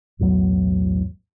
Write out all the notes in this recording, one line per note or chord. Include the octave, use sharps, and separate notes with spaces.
B1 E2 A2 F#3